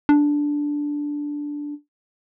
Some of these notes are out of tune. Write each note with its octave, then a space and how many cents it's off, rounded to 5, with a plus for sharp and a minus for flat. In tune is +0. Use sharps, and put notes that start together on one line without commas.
D4 -5